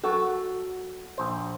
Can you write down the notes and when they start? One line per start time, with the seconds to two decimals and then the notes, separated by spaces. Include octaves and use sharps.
0.04 F#3 F#4 A4
1.18 A#1 C5